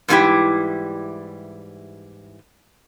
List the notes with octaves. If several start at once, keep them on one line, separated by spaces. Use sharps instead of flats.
G#2 E3 G3 B3 E4 G4